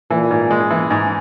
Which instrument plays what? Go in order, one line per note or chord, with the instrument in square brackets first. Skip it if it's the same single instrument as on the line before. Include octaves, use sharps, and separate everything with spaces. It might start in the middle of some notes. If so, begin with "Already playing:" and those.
[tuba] A#2 [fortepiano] E3
[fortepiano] G#2
G#3
E3
G#2